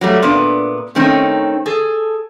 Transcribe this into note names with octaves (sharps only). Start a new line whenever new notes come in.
F#3 G3 A3
A#2 B3 D4
D#3 A3 C4 C#4 D#4
G#4 A4